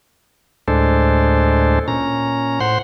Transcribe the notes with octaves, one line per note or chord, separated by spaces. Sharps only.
D2 A2 G#3 D4 A4 C5
A#2 C#4 A#5
A2 C5 F#5 C6